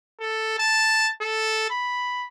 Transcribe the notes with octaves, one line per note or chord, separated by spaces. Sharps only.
A4
A5
A4
B5